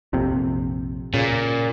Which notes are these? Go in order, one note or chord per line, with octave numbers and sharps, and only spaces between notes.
A#1 F2 C3
A#2 C#3